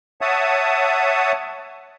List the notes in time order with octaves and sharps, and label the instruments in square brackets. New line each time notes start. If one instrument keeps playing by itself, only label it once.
[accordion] C#5 E5 F#5 A5 D#6